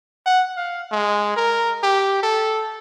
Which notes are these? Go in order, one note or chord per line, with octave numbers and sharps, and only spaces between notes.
F#5
F5
G#3
A#4
G4
A4